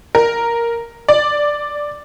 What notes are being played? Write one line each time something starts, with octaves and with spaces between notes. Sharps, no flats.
A#4
D5